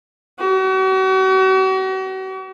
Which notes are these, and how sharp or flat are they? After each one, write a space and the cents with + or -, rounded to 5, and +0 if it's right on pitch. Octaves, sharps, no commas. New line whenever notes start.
F#4 +40